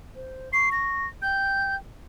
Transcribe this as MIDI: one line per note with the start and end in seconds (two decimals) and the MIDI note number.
0.15 0.52 72
0.53 1.05 85
0.53 0.69 96
0.72 1.07 94
1.22 1.77 79
1.22 1.75 91